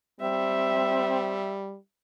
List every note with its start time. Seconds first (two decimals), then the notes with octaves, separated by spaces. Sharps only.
0.21 G3 C4 E5